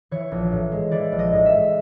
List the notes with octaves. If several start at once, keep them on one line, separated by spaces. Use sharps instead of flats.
E3 C#5
A#1
A2
G#3
E3 D5
A#1
D#5
A2
E5
G#3